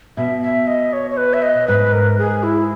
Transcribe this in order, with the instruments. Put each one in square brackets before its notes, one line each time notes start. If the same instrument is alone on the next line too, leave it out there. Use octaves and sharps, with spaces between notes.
[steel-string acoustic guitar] B2 [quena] E5
[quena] E5
D#5
C#5
C#5
B4
E5
D#5
[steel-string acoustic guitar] G#2 [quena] B4
[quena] A#4
G#4
E4